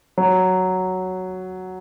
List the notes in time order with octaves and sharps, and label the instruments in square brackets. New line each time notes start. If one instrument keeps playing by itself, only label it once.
[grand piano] F#3